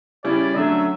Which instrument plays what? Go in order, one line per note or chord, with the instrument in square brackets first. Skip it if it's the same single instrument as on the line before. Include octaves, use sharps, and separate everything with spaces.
[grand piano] C#3 G3 C#4 E4 [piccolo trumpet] D5
[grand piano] D3 F#3 A3 C#4 [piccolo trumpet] E5